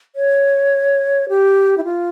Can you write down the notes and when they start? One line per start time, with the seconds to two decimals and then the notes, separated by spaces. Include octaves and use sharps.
0.16 C#5
1.29 G4
1.78 E4
1.84 F4